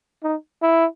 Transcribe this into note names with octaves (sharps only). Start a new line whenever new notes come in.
D#4
E4